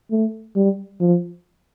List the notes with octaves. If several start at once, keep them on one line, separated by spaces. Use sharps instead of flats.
A3
G3
F3